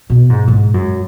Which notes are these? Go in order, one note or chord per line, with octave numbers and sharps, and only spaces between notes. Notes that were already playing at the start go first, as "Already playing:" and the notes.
B2
G#2
G#2
F#2